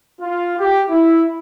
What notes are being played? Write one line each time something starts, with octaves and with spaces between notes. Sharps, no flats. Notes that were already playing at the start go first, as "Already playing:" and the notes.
F4
G4
E4